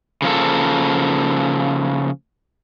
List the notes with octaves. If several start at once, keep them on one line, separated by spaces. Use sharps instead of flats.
C#3 F3 A#3 A4